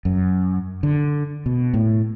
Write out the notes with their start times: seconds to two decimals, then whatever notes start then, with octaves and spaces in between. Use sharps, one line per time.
0.05 F#2
0.83 D3
1.46 B2
1.74 A2